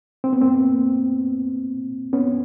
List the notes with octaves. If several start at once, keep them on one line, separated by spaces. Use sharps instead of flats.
C4
B3
A#3 C4
B3 C#4